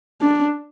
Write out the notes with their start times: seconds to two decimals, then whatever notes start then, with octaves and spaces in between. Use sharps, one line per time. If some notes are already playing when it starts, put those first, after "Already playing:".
0.21 D4